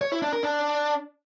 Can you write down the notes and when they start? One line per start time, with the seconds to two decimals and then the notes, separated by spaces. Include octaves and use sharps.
0.01 C#5
0.12 E4
0.22 D4
0.33 A#4
0.43 D4